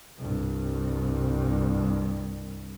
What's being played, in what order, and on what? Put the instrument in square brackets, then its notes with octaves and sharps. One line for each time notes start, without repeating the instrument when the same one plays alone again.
[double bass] C2 G2